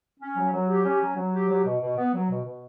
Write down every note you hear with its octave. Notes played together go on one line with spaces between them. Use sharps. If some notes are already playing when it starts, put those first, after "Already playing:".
C#4
F#3
F#3
G4
C#4
F#3
F#3
G4
F#3
B2
B2
B3
F#3
B2
B2